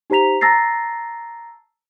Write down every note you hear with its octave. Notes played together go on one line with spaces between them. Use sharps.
D#4 G4 C5 A#5 B6 F7
A5 A#5 E6 A6 A#6 C7